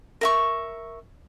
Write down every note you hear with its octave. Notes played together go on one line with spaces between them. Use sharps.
A#4 E5 C#6